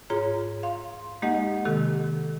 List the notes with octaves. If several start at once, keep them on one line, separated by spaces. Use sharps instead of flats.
G#2 F4 G#4 C#5 A#5
F5 C6
G#3 A#3 D#4 G4 D#5 F#5
C3 D#3 G4 A4